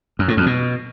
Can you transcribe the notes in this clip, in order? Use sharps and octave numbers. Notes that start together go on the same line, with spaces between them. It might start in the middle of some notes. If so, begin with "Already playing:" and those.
F#2
A2
F2
B2